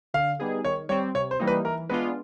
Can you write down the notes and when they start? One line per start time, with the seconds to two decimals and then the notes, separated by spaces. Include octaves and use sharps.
0.14 D3 F5
0.39 G3 B3 D#4 G#4
0.65 D#3 C#5
0.89 G3 C4 C#5
1.15 C3 C#5
1.31 C5
1.39 E3 G3 A#3 D#4
1.47 B4
1.65 E3 A#4
1.89 G#3 B3 D4 F4 B4